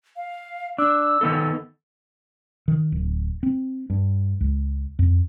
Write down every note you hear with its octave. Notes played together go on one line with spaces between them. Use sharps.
F5
D4 E6
D#3 B3 A4
D#3
D1
C4
G2
C#2
F2